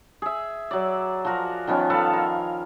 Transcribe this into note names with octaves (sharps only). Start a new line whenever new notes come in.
G#4 E5
F#3 D5
F3 F#4 A#4
D#3 F3 B3 C#4
A4 B4 F5 A5
A#4